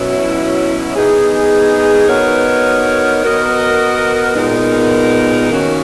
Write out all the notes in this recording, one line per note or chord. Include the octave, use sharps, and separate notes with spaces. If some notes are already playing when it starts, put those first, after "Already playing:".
Already playing: B2 F#3 C#4 E4
B3 D#4 G#4
B3 D#4 F#4 A#4 C#5
B3 F#4 A#4 D#5
A#2 G#3 B3 D#4 A#4
D#3 A#3 C#4 F#4